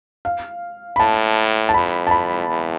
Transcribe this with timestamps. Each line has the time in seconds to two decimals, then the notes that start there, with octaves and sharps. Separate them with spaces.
0.25 F5
0.96 B5
0.99 A2 A5
1.69 A5
1.74 F2 B5
2.07 A5
2.11 B5
2.48 E2